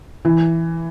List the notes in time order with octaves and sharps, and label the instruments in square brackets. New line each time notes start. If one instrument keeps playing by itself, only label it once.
[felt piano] E3